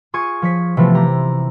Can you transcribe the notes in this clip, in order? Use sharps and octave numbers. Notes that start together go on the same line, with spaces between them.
F4 G#4 C#6 G#6 D#7
F3 C#5 B6
C3 E3 F3 A3 B3
G4 A#5